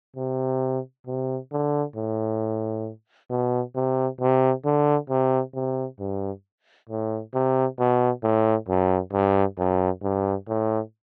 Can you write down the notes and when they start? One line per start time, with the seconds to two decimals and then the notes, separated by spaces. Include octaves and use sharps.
0.16 C3
1.07 C3
1.52 D3
1.96 A2
3.30 B2
3.76 C3
4.21 C3
4.65 D3
5.10 C3
5.54 C3
6.00 G2
6.90 A2
7.34 C3
7.79 B2
8.24 A2
8.68 F#2
9.13 G2
9.58 F#2
10.03 G2
10.48 A2